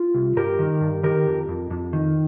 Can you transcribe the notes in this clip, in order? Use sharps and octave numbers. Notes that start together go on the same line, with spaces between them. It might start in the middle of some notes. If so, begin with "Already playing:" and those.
Already playing: F4
C2
G2 G4 A#4
D#3
G2
D#3 G4 A#4
F2
F2
F2
D#3